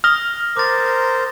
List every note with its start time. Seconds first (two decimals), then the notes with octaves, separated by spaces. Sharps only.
0.04 D#6 F6 A#6 G7
0.57 A#4 C5 D6 A6